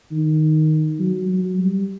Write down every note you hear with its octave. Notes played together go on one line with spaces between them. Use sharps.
D#3
F#3
F#3
G3